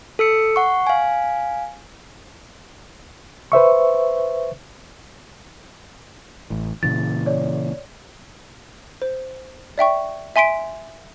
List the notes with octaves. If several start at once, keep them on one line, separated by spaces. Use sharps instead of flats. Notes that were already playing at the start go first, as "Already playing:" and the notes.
A4 E6 C#7
F#5 C#6
F5 G#5
B4 C5 E5 C#6
A1 A2
A#2 C#3 E3 A6
C#5 D5
C5
D5 E5 G5 C#6
E5 G#5 C6 B6 D7